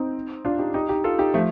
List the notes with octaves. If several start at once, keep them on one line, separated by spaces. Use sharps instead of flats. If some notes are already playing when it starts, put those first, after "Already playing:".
Already playing: C4 D#4
D4 F4
D#4 G4
D#4 G4
D#4 G4
F4 A4
D#4 G4
F3 A3